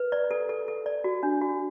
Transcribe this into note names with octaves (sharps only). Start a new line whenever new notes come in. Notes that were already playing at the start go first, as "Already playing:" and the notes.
Already playing: B4
D5
A4
A4
A4
D5
F#4
D4
F#4